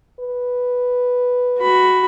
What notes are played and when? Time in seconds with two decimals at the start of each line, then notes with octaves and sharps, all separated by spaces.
0.20 B4
1.60 F#4 B5